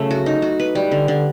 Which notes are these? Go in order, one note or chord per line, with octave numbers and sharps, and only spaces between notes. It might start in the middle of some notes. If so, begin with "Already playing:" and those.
Already playing: C#3 F#3 A3
F#4
D#4
F#4
B4
G3
D3
D3